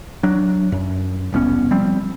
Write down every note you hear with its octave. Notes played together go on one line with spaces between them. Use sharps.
F#3 D4
F#2
E1 C2 B3 C#4
F3 G3 C4